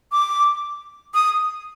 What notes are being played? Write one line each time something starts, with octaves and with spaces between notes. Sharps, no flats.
D6
D#6